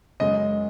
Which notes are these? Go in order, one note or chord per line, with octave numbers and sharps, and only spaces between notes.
F#2 C#3 G#3 D#5